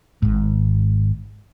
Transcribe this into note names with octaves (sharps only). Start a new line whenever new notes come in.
G#1 G#2